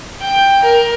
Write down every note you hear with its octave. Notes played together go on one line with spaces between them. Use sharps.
G5
A#4